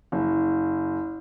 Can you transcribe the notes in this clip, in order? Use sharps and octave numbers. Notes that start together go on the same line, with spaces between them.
F#1